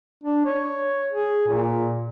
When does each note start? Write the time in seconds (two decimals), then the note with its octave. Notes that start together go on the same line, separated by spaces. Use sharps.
0.24 D4
0.45 C#5
1.12 G#4
1.48 A#2